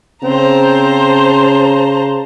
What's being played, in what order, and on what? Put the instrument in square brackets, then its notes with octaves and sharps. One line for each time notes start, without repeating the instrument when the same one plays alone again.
[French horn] C#3 [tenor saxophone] C4 [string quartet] C5 A5 A#5